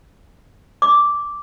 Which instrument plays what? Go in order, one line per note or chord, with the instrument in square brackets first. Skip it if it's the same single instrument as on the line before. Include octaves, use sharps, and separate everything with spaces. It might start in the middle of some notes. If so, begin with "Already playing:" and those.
[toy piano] D6